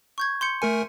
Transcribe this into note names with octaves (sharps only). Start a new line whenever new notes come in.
C#6 G6 G#6
C6 G6 C#7
A3 A#4 G#5 C#7